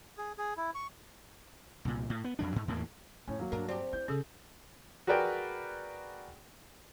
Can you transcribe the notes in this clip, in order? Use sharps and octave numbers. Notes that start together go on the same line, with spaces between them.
G#4
G#4
E4
C#6
C2 A#2
A2
B3
F2 F#3 D4
G#2
E2 A2 E3 A#3
F2 A2 C#4
F#3 A#3
G2 D4 A#4
C4 G4 D5
E4 G6
C#3 C#4 G#4 A4
F#4 G#4 A#4 B4 D5 G5